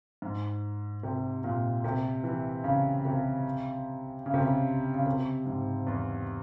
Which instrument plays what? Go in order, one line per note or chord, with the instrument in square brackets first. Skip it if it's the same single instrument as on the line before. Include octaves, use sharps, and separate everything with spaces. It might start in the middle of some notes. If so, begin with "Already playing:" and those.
[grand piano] G#2
C3
A#2
C3
E3
C#3
C3
C#3
C3
C#3
C#3
C3
G#2
E2